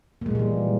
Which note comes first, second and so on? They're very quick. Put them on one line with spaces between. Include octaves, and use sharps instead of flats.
A#3 G#3 A#2 G3 E3